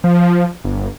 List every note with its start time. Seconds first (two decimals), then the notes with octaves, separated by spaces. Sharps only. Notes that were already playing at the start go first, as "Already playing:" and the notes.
0.04 F3
0.64 G1